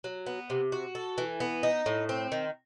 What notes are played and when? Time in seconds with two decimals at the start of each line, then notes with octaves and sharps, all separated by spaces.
0.04 F#3
0.26 B3
0.50 C3
0.72 F#4
0.95 A4
1.18 E3
1.40 B3
1.63 D#4
1.86 A2
2.09 C4
2.32 D#3